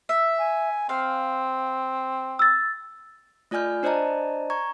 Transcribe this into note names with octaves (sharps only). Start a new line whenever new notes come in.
E5
G#5
C4 F5
E6 A6
A3 F4 D5 G#5 F6 G6
D4 C5 D5 D#5 A5 A#5
A#5 C#6 G#6